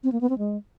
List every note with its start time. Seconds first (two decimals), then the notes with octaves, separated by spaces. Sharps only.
0.04 C4
0.12 A#3
0.21 B3
0.30 C4
0.38 G#3